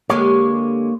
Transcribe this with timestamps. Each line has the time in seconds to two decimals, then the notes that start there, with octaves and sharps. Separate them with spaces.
0.10 D3 G#3 A#3 G4 C#5